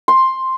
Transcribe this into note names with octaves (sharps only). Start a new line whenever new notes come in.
C6